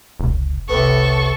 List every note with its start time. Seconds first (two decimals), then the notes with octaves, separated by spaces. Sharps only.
0.20 F1 C#2
0.69 C2 A2 C3 B3 A4 C#6